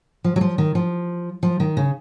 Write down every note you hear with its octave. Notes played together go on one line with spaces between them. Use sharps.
F3
F#3
F3
D#3
F3
F3
D#3
C#3